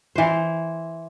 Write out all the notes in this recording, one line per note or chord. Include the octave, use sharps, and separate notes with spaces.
E3 C5